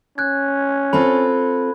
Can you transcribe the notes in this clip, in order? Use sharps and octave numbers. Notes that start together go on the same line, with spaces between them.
C#4 F#6 G#6
C4 F4 A4 B5